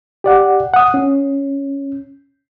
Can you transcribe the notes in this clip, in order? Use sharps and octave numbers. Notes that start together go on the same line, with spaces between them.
G4 D5 F#5
F#5 D#6
C#4